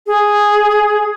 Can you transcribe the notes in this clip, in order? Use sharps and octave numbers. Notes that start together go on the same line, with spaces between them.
G#4